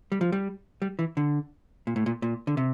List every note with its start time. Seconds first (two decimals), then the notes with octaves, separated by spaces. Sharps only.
0.12 G3
0.21 F3
0.32 G3
0.82 G3
0.99 E3
1.17 D3
1.87 A#2
1.96 A2
2.06 A#2
2.22 A#2
2.47 D3
2.57 C3